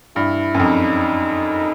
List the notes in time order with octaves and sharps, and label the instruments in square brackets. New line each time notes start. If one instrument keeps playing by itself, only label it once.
[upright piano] G2 [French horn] E4
[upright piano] F#2
[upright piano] F2 [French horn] D#4